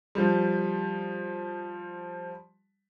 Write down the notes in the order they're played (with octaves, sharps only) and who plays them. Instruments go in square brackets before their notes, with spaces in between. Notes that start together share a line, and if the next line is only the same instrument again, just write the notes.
[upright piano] F3 G3